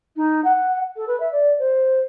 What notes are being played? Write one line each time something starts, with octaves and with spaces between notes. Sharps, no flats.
D#4
F#5
A4
B4
E5
D5
C5